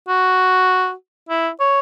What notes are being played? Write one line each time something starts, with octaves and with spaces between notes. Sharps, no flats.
F#4
E4
C#5